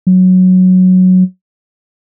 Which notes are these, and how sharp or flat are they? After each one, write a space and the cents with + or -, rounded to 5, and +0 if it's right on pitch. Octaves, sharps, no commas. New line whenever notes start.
F#3 -5